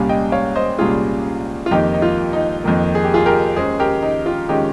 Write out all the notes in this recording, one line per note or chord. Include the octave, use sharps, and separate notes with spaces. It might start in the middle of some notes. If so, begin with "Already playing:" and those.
Already playing: C2 A#2 G3 C#4 F5 G#5
D#5 G5
C#5 F5
C5 D#5
C2 A#2 G3 C#4 F4 G#4
F4
F2 D#3 A#3 D#4 G4
D#4
F4
D#4
F2 D#3 A#3
G#4
G4
F4 G#4
G4 A#4
D#2 D#3 G#3 C#4 G#4 C5
G4 A#4
D#4
F4
D#3 G#3 C#4 D#4 G4